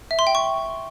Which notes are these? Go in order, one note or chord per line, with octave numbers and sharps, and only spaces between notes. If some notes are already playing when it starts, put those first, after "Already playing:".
E5
C6
G5
C#6